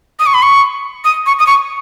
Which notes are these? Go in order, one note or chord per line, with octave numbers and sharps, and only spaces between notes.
D#6
C#6
B5
C#6
D#6
C#6
D#6
C#6